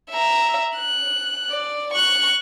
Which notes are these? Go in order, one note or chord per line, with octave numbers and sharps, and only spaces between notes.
E5 A#5
F#6
D5
C#6 F#6